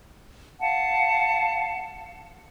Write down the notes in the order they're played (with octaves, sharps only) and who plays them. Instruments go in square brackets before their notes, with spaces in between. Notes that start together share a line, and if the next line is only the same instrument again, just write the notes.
[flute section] F5 F#5 A5